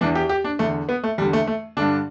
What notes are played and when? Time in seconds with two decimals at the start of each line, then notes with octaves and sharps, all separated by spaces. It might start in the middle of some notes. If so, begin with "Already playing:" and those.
0.01 E2 E3 D4
0.15 G4
0.29 G4
0.44 D4
0.59 E2 D3 A3
0.89 B3
1.03 A3
1.18 E2 G3
1.21 D3
1.33 A3
1.47 A3
1.77 G2 D3 D4